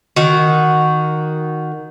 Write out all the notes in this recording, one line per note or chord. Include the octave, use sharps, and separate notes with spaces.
D#3 F#4